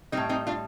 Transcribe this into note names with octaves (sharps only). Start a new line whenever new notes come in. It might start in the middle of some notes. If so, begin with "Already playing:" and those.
A2 G3 C4 D#4
C4 D#4
D4 F4